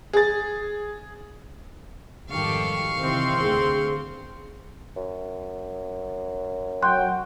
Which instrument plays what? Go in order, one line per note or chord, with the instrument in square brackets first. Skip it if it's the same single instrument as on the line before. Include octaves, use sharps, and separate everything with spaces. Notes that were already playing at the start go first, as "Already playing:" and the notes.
[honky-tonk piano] G#4 A6
[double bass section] G#1 F2 D#3 [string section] G3 G4 A4 [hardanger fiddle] F5 C#6
[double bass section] C3 D#3 E3 [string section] C4 C6
[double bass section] D2 [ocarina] G#4
[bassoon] F#2
[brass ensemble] F#3 G5 [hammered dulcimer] F#4 [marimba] C6 F#6